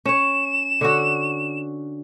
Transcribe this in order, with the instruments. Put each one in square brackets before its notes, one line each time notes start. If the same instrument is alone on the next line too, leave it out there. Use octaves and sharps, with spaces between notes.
[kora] C#4 C#5 [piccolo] E7
[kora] D3 C#4 F#4